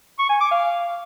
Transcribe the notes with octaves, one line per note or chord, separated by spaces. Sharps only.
C#6
G#5
D6
F5